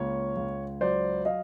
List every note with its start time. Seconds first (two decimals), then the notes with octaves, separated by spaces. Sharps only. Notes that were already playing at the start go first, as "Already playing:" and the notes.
Already playing: C#2 A#3 C#5
0.36 C#2
0.81 F#3 C5 D5
1.25 D#5 F5